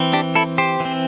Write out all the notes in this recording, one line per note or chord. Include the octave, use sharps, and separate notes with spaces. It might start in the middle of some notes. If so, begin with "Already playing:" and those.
Already playing: E3 C4
D4 G4
E4 A4
G4 C5
E3
C4